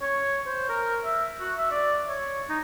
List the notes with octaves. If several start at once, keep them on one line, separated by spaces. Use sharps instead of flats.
C#5
C5
A#4
E5
F#4
E5
D5
C#5
D#4